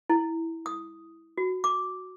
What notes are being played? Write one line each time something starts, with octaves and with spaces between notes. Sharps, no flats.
E4
D#6
F#4
D6